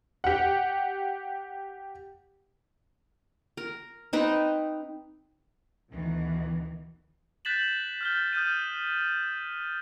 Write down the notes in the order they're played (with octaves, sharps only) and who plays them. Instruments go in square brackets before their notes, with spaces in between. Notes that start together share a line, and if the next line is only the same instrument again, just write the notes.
[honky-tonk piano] G4 F#5
[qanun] A#4
C4 D#4 B4
[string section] D2 B2 D#3 E3
[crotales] F#6 G6 A6 B6 E7 F#7
F6 G6 G7
D#6 F6 G6 D#7